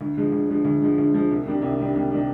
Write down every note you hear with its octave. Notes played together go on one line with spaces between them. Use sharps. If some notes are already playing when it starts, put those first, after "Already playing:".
D2
D3 F3 G#3
D2
D3 F3 G#3
D2
D3 F3 G#3
D2
D3 F3 G#3
C2
C3 D#3 G3 D4
C2
C3 D#3 G3 D4
C2
C3 D#3 G3 D4